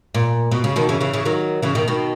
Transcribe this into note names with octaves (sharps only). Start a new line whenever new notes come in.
A#2
B2
C#3
B2 D#3
C#3 E3
C#3 E3
C#3 E3
D#3 F#3
C#3 E3
B2 D#3
B2 D#3